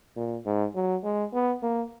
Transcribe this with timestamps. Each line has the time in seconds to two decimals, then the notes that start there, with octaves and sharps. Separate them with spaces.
0.16 A#2
0.46 G#2
0.75 F#3
1.04 G#3
1.33 B3
1.63 A#3